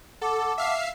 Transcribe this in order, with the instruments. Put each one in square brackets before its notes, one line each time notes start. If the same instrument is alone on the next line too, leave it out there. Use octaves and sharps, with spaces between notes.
[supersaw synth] A4 [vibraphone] F#5 A5 D6
[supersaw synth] E5 F5 C7